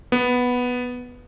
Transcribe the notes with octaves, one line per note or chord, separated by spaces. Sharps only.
B3